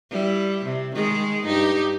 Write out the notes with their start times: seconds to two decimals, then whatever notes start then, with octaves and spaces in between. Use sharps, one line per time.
0.10 G3 E4
0.65 C3
0.95 D#3 G#3 G#4
1.45 G2 D#4 G4